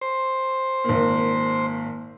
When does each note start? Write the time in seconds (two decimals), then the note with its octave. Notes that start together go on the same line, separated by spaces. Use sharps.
0.02 C5
0.84 G#1 A#2